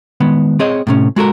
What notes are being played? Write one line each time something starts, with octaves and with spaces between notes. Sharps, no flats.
D#3 G#3 B3
C4 G#4 C#5 D#5
A2 C3 C#4
G#3 F#4 A4 A#4